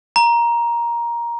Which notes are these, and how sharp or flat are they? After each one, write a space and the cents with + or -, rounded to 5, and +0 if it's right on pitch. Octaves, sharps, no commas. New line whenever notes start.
A#5 +15